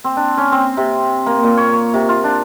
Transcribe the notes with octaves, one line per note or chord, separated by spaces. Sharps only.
C4
D4
C#4
C4
C3
A#3
A#2
C#5
C#5
C3
F4
D4